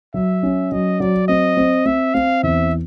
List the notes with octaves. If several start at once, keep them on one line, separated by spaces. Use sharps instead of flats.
F#3 E5
C#4
F#3 D#5
F#3 D5
C4 D#5
C4
C4 E5
C4 F5
E2 E5